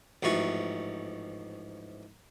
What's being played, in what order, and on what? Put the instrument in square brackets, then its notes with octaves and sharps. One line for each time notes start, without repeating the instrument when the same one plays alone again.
[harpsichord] A1 G#2 F3 F#4